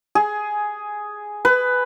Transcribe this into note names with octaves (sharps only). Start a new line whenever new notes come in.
G#4
B4